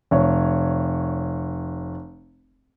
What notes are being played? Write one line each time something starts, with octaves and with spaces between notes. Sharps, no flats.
F1 C#5